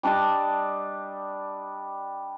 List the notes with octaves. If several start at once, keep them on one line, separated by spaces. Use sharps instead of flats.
G3 D4 D#5 A5